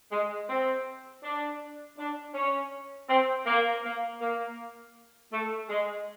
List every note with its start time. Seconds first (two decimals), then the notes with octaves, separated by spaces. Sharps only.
0.12 G#3
0.49 C4
1.23 D4
1.98 D4
2.35 C#4
3.09 C4
3.46 A#3
3.84 A#3
4.21 A#3
5.33 A3
5.69 G#3